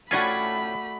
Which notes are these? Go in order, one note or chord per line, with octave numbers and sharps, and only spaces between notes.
A2 A3 C#4 F4 F#4 D5 G#5 B5